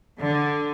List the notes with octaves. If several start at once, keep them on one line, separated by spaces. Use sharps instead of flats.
D3